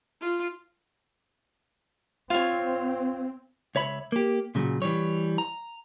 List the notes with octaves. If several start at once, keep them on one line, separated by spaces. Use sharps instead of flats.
F4
C4 F4 C#5
C#2 C#5 E5 B5
A#3 G4
A#2 C#3 F#3
E3 G3 C#5
A#5